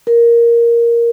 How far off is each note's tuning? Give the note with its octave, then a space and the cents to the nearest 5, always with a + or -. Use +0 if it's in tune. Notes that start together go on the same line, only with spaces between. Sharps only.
A#4 +5